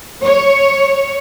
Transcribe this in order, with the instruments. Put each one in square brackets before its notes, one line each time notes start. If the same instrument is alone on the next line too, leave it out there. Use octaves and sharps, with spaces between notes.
[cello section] C#5